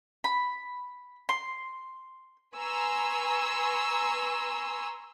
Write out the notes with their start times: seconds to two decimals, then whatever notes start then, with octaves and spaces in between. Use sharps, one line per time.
0.24 B5
1.29 C6
2.58 B4 G#5 A#5 C6 C#6 E6